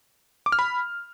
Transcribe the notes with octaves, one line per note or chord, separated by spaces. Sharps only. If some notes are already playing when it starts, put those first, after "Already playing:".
D6
F6
B5